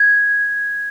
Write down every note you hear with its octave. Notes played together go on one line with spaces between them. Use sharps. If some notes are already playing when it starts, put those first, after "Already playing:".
Already playing: G#6